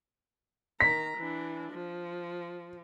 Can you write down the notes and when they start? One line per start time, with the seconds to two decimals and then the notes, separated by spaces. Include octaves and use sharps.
0.80 D#3 A#5 B6
1.17 E3 D4
1.71 F3